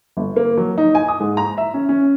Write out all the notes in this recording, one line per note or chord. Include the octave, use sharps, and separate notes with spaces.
G1
A#3
F#3
D#4
G#5
D#6
G#2
A#5
E5
C#4
C#4